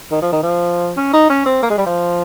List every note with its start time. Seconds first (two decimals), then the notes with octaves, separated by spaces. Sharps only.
0.11 D#3
0.22 F3
0.32 D#3
0.43 F3
0.97 C#4
1.13 D#4
1.29 C#4
1.46 C4
1.62 A#3
1.70 G#3
1.78 G3
1.86 F3